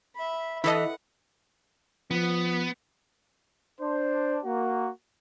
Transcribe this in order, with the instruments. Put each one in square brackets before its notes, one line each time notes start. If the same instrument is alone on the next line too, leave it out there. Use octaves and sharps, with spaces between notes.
[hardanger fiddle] E5 B5
[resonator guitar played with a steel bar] E3 [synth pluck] E4 A4 D#5 [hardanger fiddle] B4 F#5
[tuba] F3 [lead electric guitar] B3
[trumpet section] D4 C5
A#3 F#4